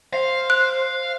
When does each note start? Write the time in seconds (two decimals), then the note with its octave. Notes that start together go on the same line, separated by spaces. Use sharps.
0.13 C5 F5
0.50 F#6